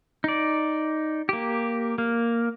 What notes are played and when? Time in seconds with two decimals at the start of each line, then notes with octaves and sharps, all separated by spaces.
0.24 D#4 D5
1.29 A#3 G4
1.98 A#3